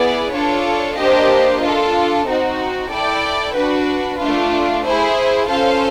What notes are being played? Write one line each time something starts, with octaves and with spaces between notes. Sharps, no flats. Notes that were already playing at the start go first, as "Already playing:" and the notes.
Already playing: B3 E4 G#4 B4 D5
D4 F4 A4 C#5
A#3 D4 G4 C5 D#5
D4 F4 A4
C4 D#4 F#4
E4 A4 D5 G5
D4 F#4 B4
A3 D4 F4
E4 G#4 C5
C#4 F4 A4 C5 F5